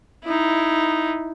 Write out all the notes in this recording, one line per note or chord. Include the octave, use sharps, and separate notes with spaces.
D#4 E4